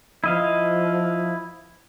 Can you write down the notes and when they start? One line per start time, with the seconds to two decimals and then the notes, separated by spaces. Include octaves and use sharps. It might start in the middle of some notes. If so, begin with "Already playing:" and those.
0.24 F3 E4 D#5 F5